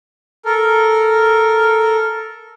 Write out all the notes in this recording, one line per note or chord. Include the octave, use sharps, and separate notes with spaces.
A4 A#4